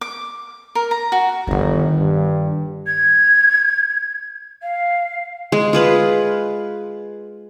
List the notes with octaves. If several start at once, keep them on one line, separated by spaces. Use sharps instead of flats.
D6
A#4
A#5
F#4
G1 D#3 B3
G2
G#6
F5
G#3
F4 G#4 B4